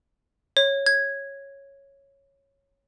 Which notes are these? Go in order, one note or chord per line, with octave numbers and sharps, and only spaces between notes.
C#5
G#6